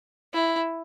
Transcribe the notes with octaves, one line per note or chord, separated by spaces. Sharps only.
E4